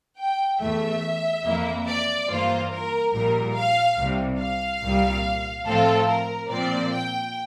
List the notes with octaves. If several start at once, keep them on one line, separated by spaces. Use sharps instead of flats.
G5
E2 E3 A3 E5
F2 E3 A#3 E4
D5
G2 E3 A#3 F4 C5
A#4
A#1 A#2 G3 A#4
F5
C2 C3 G3
F5
C2 A#2 G3
A2 F3 C4 F4 A4
A#4
A#2 F3 C4 D5
G5